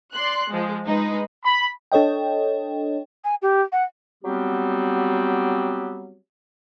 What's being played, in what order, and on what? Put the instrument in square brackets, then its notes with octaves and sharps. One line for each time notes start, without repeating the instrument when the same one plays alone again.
[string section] D5 C6 F#6
F3 G#3
G#3 D#4 B4
[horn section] B5
[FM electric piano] D4 A4 C#5 D#5 G5
[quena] G#5
G4
F#5
[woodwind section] F#3 G3 B3 C4 G4